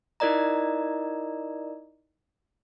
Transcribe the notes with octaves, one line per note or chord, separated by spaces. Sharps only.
D#4 E4 A#4 D5 D#5 A#5